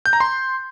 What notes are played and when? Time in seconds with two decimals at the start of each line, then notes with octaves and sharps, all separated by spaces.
0.06 G6
0.13 A#5
0.20 C6